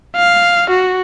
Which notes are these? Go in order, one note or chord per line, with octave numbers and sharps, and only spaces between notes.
F5
F#4